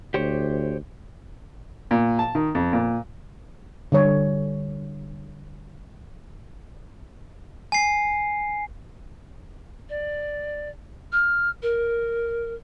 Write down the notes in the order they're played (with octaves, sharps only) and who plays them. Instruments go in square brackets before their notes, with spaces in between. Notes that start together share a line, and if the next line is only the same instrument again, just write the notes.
[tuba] D2 [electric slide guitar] G4 C5 C#5
[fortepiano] A#2
A5
D#3
F2
A#2
[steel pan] D3 G3 C#5
[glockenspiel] G#5 C7
[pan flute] D5
F6
A#4